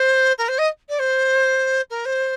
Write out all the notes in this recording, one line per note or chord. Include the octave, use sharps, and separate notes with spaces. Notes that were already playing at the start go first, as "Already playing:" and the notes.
Already playing: C5
A#4
C5
D#5
D5
C5
A#4
C5